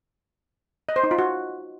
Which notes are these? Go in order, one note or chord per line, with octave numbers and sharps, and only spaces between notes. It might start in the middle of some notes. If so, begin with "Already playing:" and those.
D#5
C5
D#4
F4
F#4